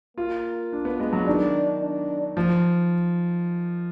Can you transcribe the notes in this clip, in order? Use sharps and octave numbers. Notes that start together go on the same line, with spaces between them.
A#3 F4
D4
B3
G#3
F#3
D#3 D4
D4
F3